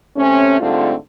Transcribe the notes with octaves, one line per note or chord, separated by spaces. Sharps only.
C3 A3 C4 C#4
G#2 D3 G3 A3 C4 F4